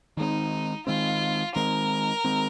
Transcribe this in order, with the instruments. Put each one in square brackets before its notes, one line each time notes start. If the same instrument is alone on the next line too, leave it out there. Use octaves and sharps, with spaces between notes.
[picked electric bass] D#3 G#3 C4 [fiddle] D#4
[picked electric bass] D#3 G#3 C4 [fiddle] F4
[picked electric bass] D#3 G#3 C4 [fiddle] A#4
[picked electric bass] D#3 G#3 C4